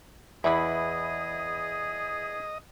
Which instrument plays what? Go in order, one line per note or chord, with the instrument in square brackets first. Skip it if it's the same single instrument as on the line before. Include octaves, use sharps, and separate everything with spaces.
[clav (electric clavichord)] E2 E3 [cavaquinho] E4 B5 [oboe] G#4 [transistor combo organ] D#5